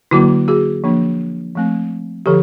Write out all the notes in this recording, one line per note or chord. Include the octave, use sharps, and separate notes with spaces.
D3 F#3 A#3 E4 F#4
F#4 G#4
F3 A#3 D4
F3 A3 C4
D3 F3 G4 A4